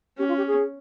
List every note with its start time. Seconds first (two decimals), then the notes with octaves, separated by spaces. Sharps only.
0.18 C#4 G4
0.28 F4
0.37 G4
0.47 G#4